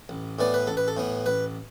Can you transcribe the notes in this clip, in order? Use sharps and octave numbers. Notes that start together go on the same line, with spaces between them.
A1
A2 E3 B3 D5
B4
A1 A4
B4
A4
A2 E3 B3
A1 B4